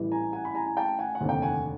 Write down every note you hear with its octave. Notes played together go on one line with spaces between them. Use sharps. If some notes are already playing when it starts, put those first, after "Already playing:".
Already playing: A1 A2 E3 G3
G#5 A#5
F#5 G#5
B5
G#5 A#5
G#5
G5 A5
F#5 G#5
F#5
F1 D#2 D3
G5
F#5 G#5